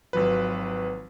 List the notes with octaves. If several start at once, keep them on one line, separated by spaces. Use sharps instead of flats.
G#1 F3 F#3 B4